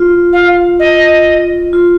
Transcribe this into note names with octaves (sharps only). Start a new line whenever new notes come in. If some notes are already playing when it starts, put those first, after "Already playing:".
Already playing: F4
F5
D#5
F4